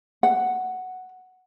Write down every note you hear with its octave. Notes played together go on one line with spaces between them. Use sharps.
F#5